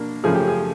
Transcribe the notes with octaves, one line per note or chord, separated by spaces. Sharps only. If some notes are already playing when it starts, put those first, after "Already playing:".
Already playing: B2 A#3 D4
F#2 C#3 F3 A3 G#4
G4
G#4